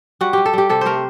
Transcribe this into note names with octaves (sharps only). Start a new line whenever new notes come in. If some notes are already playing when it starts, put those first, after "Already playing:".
G3 F#4
G3 G4
A4
G3 G4
C3 A4
A3 A#4 C5